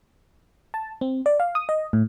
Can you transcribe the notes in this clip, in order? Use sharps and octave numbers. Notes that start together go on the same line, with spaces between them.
A5
C4
D5
F5
D#6
D#5
A2